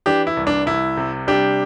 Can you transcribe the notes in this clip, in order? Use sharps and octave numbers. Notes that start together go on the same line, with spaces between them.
E3 D4 G4
E4
C2
D4
C2 E4
C3
G3 D4 G4